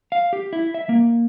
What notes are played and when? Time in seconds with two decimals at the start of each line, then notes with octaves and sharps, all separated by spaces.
0.12 F5
0.33 G4
0.53 E4
0.74 E5
0.89 A#3